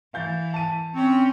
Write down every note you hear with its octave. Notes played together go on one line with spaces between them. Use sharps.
E3 F5 G6 A6
A5 D#7
C4 C#4 C#5